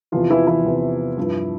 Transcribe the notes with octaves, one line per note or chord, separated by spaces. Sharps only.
E2 C3 E3 F3 F4
E3 E4
E3 E4
E2 C3 E3
G2 F3